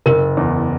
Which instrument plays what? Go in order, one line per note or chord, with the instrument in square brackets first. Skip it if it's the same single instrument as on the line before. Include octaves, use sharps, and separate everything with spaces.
[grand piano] F#1 [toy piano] A#4
[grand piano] E2